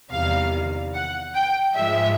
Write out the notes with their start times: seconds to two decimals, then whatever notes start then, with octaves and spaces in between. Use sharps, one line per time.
0.10 E2 C3 D#3 G3 F5
0.94 F#5
1.34 G5
1.76 G#2 F3 G#3 E5